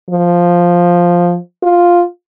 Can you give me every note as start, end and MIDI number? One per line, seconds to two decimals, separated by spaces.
0.10 1.37 53
1.63 2.03 65